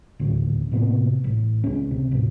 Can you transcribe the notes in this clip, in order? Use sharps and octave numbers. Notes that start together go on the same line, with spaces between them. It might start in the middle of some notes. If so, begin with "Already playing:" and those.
D#1 A1 D2
A2 C3 A#3 B3
A1
C#2 B3 C#4
C3
A1 D#2